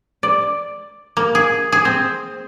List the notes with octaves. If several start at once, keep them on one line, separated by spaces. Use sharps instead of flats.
D5
A#3
G#4
G#4
C4